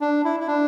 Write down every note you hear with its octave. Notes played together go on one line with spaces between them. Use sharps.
D4
E4
E4
D4